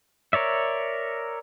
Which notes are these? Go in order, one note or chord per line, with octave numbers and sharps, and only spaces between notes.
A#4 C#5 D5 E5